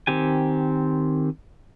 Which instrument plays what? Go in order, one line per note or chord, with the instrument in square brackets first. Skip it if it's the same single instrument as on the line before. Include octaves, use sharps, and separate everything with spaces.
[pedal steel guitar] D#3 C4 G4 G#5